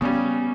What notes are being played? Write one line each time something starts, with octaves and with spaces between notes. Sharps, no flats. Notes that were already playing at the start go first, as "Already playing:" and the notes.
C#3 G3 B3 C#4